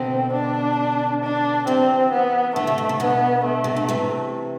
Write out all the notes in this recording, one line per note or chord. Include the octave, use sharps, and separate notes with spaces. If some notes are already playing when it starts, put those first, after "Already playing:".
Already playing: B2 D3 C4
D4
D4
C3 E3 C4
B3
D3 A3
C3
B2
C3
B2 D3 B3
A3
C3
D3
C3 E3